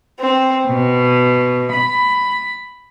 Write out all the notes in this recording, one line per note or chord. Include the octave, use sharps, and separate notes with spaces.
C4
B2
B5